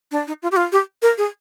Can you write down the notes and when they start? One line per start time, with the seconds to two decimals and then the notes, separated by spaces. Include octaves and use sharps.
0.11 D4
0.27 D#4
0.42 F4
0.52 G4
0.57 F4
0.72 G4
1.02 A#4
1.18 G#4